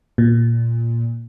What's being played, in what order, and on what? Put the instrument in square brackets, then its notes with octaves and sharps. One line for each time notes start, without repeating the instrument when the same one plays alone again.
[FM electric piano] A#2